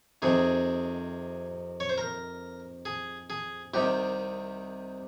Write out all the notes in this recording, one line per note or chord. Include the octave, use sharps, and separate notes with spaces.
F2 C3 D#3 G#4
C#5
C5
A#4
G#4
G#4
C2 C3 D#3 G4